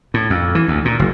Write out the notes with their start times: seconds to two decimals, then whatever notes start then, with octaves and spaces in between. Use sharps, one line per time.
0.14 A2
0.30 F2
0.55 E3
0.68 D2
0.85 A#2
0.99 F#1